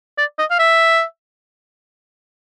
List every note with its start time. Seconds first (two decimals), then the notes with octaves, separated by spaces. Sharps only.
0.18 D5
0.39 D#5
0.50 F5
0.59 E5